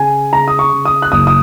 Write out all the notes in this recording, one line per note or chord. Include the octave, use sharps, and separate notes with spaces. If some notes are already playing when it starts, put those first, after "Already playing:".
Already playing: C#3 G#5
C#3 A#5
D#6
C#6
C#3
D#6
F#6
F#1 D#6
D#6